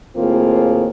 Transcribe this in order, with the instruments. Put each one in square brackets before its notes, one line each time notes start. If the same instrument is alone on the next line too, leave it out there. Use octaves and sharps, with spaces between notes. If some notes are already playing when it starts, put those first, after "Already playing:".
[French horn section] D#2 A2 A#3 C4 F4 G#4